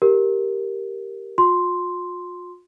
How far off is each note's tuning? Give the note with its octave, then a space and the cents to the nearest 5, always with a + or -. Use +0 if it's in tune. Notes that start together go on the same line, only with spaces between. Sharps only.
G4 +0 A#4 +0
F4 +40 C6 +0